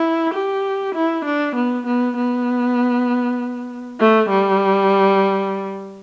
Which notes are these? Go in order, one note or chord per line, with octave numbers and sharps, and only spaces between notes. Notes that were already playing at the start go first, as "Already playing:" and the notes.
Already playing: E4
G4
E4
D4
B3
B3
B3
A3
G3